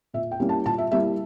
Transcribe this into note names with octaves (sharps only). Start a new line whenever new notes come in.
A#2 E5
G5
G3 A#3 C#4 E4
A5
A#2 A5
E5
G3 A#3 E4 E5